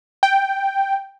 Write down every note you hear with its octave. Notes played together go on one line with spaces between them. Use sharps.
G5